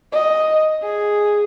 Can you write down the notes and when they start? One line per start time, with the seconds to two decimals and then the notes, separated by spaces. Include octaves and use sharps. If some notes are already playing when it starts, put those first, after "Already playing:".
0.13 D#5
0.82 G#4